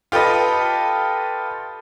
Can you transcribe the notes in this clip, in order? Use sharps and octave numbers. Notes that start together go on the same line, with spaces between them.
F4 G4 A4 B4 D#5